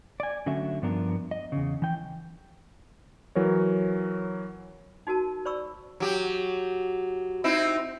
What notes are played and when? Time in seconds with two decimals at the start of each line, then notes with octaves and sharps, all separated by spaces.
0.20 D5 G#5
0.46 D3 F#3 A3 C#4 E5
0.82 G2 F3 B3 D4 A#4
1.31 D#5
1.52 E2 C#3
1.82 E3 G5
3.35 E3 F#3 A#4 C#5
5.07 D#4 F#4 A#4 A5
5.45 C5 D5 B5 C#6 E6
6.00 F#3 G4
7.44 C4 D#4 E4